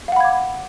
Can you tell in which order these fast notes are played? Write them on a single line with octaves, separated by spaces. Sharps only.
F5 F#5 B5 G#6 D6